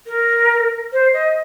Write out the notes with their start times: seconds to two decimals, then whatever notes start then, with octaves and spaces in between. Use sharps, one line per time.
0.07 A#4
0.93 C5
1.14 D#5